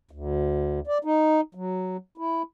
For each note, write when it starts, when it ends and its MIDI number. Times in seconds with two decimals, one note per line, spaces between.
0.11 0.80 38
0.87 0.98 74
1.04 1.41 63
1.55 1.97 54
2.17 2.42 64